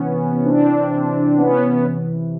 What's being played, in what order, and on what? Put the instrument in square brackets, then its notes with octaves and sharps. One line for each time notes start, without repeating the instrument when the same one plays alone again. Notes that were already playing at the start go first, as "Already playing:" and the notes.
Already playing: [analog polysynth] C3 E3 B3 C#4
C4 D4
B3 C#4